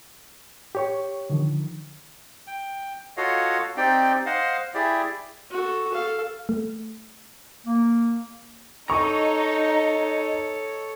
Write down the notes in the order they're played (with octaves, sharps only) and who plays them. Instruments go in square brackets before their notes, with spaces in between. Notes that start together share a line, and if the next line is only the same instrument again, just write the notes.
[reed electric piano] G4 C#5 C#6
D3 D#3 F3
[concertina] G5
F4 F#4 A4 C#5 D#5 F5
C4 D#4 G4 D5 G5
C5 D#5 F5 F#5
E4 G4 G#4 D5
[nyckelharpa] F#4 A4
A4 F5
[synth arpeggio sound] A3
[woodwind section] A#3
[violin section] D#4 [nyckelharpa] A4 C#5 [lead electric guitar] D#5 A#5 [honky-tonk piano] C#6